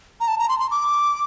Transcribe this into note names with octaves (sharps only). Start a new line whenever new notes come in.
A#5
A5
A#5
C6
C6
D6